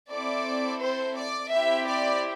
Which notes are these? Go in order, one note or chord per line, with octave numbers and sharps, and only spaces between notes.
C4 E4 A4 D5
C5
D5
C4 E4 G4 E5
D5